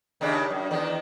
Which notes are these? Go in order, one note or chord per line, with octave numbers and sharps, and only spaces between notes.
D#2 C#3 D4
F#2
E2 D#3